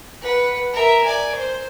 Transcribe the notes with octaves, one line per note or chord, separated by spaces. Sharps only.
B4 F#5
A#4 E5
D5 G#5
C5